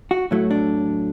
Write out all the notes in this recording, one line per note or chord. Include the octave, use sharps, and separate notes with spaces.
F#4
A2 F#3 A3 E4
D4